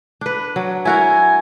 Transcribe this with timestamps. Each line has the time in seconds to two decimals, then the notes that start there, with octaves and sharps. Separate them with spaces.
0.21 D4 B4
0.56 F#3
0.85 E4 F#4 A#4 G#5